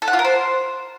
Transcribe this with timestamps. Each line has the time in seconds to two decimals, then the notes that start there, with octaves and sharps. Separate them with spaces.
0.02 A4
0.08 F#5
0.13 F4
0.19 A#4
0.25 C5